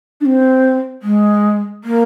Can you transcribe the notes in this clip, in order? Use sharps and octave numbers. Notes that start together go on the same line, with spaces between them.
D4
C4
G#3
A#3